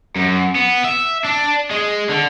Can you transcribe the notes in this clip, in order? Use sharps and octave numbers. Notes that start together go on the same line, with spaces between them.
F#2
B3
E5
D4
G#3
D3